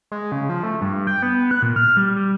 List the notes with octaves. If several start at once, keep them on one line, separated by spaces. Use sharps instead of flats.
G#3
C#3
F3
A3
G2
G5
B3
F#6
A#2
F6
G3
G3